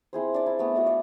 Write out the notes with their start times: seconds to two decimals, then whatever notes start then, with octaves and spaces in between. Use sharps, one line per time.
0.13 C4 E4 G#4 C5
0.34 D4 D5
0.46 E4
0.59 A3 B3
0.75 D4 F#4 A4 D#5
0.86 D5 F5